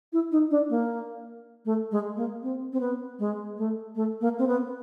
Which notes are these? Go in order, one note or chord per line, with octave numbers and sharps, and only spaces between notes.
E4
D#4
D4
A#3
A3
G#3
A#3
C4
C4
B3
G#3
A3
A3
A#3
C4
B3